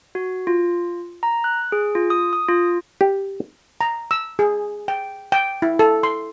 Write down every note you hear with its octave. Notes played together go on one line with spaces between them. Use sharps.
F#4
F4
A#5
F#6
G#4
F4
D#6
D#6
F4
G4
A#5
E6
G#4
G5
G5
E4
A4
C6